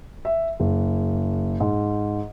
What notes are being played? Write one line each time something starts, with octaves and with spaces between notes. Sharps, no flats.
E5
F#1
G#2